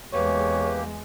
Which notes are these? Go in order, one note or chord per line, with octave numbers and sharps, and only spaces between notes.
E2 G#3 A#3 G4 B4 C#5